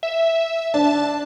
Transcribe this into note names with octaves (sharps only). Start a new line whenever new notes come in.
E5
D4 A5